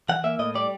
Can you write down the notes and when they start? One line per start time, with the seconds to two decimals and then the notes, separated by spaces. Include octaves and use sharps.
0.09 E3 F#5
0.24 A#3 E5
0.39 A2 D#5
0.55 G3 D5